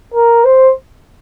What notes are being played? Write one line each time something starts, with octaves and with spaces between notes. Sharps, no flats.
A#4
C5